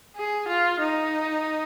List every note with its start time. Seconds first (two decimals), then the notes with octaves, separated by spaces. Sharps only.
0.16 G#4
0.48 F4
0.80 D#4